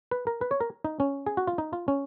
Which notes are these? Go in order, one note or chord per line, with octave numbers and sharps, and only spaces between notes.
B4
A#4
B4
C#5
A#4
D#4
C#4
G#4
F#4
F4
D#4
F4
C#4